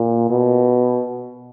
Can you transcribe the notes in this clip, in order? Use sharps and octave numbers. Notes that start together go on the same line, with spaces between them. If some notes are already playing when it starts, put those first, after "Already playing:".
Already playing: A#2
B2